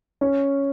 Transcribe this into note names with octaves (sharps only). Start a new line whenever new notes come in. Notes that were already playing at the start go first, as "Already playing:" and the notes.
C#4